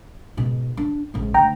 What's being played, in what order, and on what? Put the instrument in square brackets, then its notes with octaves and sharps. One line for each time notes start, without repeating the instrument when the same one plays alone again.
[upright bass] G#2 B2
D4
A1 G#2
[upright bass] D2 [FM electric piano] G5 A#5